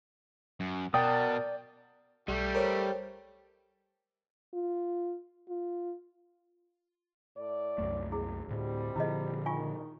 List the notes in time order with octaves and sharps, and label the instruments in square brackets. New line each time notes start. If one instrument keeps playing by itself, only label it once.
[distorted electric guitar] F#2
[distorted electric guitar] B2 [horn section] A#4 F#5 A5 [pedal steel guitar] D5 D#6 [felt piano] G5
[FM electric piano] B1 [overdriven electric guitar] G3 [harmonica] A3 G4
[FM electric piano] A#4 C5 C#5
[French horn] F4
F4
[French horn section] A2 D5
[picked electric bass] C2 F#2 A3
[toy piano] E4 G#4
[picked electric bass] D2 A2 [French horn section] G3 C4
[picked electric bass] A#2 D3 F3 [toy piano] E4 G#4 D#5
[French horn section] D#3 [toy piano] F4 G#5 C#6